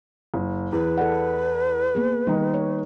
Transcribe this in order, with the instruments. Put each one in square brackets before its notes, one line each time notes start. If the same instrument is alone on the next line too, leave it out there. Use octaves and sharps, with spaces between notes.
[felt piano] F#1
[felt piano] E2 [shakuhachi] B4
[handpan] A4 D5 F#5
A#3 B3 G#4
[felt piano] D#3 D#4 [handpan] G3
[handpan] C#5